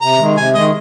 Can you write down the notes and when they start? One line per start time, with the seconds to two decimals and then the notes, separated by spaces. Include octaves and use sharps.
0.01 C3 A#5
0.18 D#3 G#3
0.37 C3 G#5
0.54 D#3 G#3 D#5